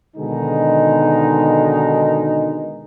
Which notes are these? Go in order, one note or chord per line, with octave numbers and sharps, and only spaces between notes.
B2 D3 D#3 G#3 D#4